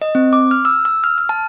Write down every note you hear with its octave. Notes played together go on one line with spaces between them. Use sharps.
D#5
C4
D6
F6
E6
E6
F6
F6
A5